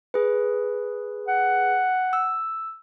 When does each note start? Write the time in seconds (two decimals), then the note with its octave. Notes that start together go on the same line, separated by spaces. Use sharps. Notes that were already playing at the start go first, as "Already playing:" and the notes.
0.14 G#4 B4
1.28 F#5
2.13 E6